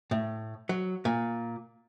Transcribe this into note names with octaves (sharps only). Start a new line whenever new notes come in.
A2
F#3
A#2